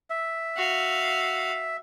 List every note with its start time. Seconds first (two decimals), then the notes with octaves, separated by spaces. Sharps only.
0.10 E5
0.57 F#4 F5